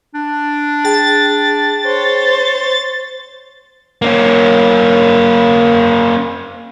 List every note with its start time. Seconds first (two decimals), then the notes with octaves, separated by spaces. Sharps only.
0.14 D4
0.85 G#4 G5 A6
1.85 C5 C#5
4.02 A#3 C#4